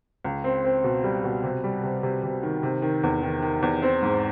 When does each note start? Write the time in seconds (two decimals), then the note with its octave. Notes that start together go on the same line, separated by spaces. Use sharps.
0.25 C#2
0.44 C4
0.64 C4
0.84 B2
1.04 G3
1.24 B2
1.44 C3
1.64 G3
1.83 C3
2.03 C3
2.23 C3
2.43 D#3
2.63 C3
2.82 D#3
3.03 E2
3.23 D#3
3.42 D#3
3.62 E2
3.82 C4
4.02 G#2